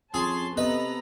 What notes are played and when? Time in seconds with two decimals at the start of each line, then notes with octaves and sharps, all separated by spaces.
0.14 F2 C#4 G#4 A5 C6
0.57 C3 B3 A4 B4 D#5 A#5